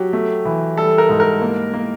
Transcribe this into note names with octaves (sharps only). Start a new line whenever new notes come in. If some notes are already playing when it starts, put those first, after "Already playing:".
Already playing: F#3 G4
A3
E3
G3 A4
A#4
G#2
A#4
A#3
A#3